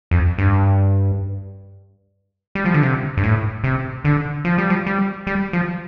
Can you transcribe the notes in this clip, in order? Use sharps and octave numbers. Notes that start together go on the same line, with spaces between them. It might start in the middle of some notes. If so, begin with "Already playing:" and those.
F2
G2
G3
F3
D3
C3
G2
A2
C3
D3
F3
G3
F3
G3
G3
F3